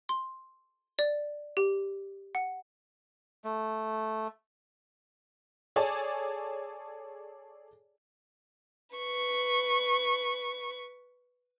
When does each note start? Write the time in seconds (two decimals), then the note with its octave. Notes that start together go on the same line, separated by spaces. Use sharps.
0.09 C6
0.99 D5
1.57 G4
2.35 F#5
3.44 A3
5.76 G#4 A4 C#5 D5 G#5 A5
8.96 B4 C#6